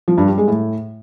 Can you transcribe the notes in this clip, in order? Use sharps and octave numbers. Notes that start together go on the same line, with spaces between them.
F3
G2
G3
G#3
A2